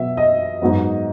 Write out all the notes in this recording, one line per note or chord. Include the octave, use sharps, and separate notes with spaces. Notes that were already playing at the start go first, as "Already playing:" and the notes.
Already playing: B2 F#3 B3 E5
D#5
G#2 F#3 B3